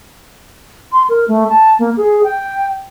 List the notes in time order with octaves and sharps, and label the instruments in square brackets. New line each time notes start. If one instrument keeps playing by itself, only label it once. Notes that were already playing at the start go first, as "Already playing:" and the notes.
[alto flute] C6
A#4
A3
A5
A#3
G#4
G5